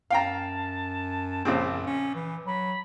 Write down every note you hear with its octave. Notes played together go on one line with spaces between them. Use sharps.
F#2 F5 G5 A5 A#5
A#1 F#2 C#3 C4
C#4
E3
F#3 B5